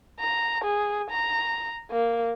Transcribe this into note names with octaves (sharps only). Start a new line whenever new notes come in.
A#5
G#4
A#5
A#3